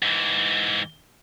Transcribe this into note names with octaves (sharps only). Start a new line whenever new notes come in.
G#2 E3